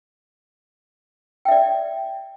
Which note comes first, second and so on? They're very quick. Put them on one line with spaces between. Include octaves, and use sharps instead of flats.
G5 E5 D5